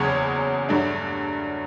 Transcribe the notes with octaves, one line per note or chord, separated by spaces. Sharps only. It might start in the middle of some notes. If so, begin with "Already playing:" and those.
Already playing: F#1 E2 C#3 F#3 C#5
G2 F#3 A3 D4